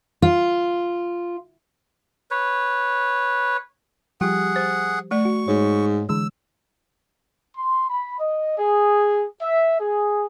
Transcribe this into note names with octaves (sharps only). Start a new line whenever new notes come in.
F4
B4 C#5
F3 G3 G4 G#4 F#5
C5
A3 D5 C#6
F#4
G#2 C#5
D3 E3 G#3 E6
C6
B5
D#5
G#4
E5
G#4